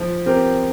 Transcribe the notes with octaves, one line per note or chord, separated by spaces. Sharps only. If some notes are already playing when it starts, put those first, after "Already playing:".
Already playing: F3
C4 G4 A#4